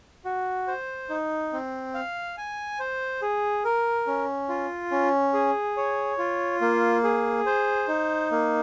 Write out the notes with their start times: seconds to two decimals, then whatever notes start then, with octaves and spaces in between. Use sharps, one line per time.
0.25 F#4
0.67 C5
1.09 D#4
1.52 C4
1.94 F5
2.38 G#5
2.80 C5
3.22 G#4
3.65 A#4
4.07 C#4
4.49 F4
4.91 C#4
5.34 G#4
5.77 C#5
6.18 F4
6.61 A#3
7.04 G#4
7.46 C5
7.88 D#4
8.31 A#3